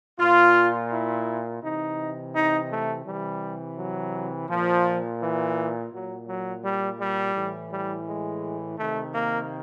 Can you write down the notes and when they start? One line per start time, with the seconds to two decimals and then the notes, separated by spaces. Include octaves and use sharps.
0.19 A#2 F4
0.91 E4
1.62 C3 E3 D#4
2.34 D#4
2.69 A3
3.05 C3 E3 G3
3.77 F#3
4.48 A#2 F3
5.20 E3
5.92 A#2 F#3
6.27 F#3
6.63 G3
6.99 G3
7.35 A2 E3
7.70 G3
8.06 G#3
8.77 C3 D#3 A3
9.13 A#3